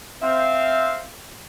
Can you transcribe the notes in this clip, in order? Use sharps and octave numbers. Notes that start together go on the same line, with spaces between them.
C4 E5 F5